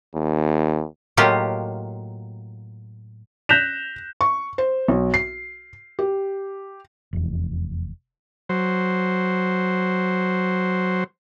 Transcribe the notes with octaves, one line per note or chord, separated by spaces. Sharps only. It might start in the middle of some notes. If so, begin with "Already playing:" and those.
D#2
A2 F#3 A#3 D#4 F4 G4
F#6 G6 A#6 B6 E7 F7
C#6
C5
B1
C7
G4
F1 E2
F#3 C5